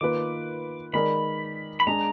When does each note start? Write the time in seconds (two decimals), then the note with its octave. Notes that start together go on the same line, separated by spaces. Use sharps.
0.01 D#3 A#3 F4 B4 D6
0.93 D#3 G#3 D#4 A#4 D5 B5
1.80 B5
1.87 G#3 D4 G#4 A#5